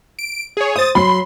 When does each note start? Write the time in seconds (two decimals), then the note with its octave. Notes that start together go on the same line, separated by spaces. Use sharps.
0.19 D7
0.57 G#4 C#5
0.76 C5 D#6 A6
0.95 F#3 B5 C6